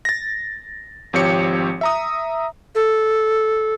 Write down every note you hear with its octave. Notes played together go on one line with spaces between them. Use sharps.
A6 A#6
G#1 F3 C4 G4 C#5 C#7
E5 A#5 D#6
A4